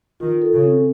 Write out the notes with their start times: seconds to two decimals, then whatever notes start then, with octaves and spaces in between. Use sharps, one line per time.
0.20 D#3 F4
0.42 A4
0.53 C#3
0.63 C4